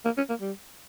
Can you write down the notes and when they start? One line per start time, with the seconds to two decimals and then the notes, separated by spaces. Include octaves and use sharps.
0.05 A#3
0.17 C#4
0.29 A#3
0.41 G3